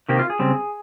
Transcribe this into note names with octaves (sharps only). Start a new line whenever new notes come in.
C3 D#3 A#3 G4
F4
G#4
C#3 G3 C4